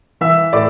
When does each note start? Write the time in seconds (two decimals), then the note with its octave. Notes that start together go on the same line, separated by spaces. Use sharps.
0.21 E3 E5 E6
0.53 A2 D5 D6